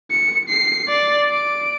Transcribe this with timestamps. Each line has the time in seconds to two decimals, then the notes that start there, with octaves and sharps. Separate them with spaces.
0.11 C#7
0.49 C7
0.89 D5
1.31 D7